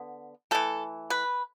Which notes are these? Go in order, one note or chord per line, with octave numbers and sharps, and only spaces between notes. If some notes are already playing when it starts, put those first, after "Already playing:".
Already playing: D3 B3
E3 A3 A4
B4